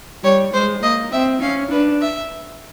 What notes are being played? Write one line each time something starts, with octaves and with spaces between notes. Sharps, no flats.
G3 C#5
G#3 C5
A#3 D#5
C4 E5
C#4 F5
D4 B4
E5